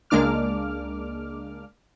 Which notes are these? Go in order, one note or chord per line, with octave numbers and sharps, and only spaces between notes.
C#2 G#3 A#3 D4 D6 F6